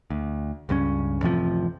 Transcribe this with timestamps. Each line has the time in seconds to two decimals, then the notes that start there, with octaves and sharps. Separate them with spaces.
0.10 D2
0.69 C#2 G2 C4 C#4
1.21 A1 F2 C3 F3